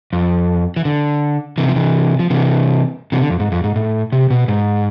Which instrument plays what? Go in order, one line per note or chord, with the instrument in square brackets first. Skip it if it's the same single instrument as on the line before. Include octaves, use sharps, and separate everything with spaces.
[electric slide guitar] F2
E3
D3
C3 E3
F3
C3 E3
F3
C3 E3
C3 E3
D3
F2
G#2
F2
G#2
A2
C3
B2
G#2